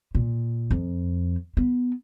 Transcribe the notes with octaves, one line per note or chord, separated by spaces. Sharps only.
A#2
F2
B3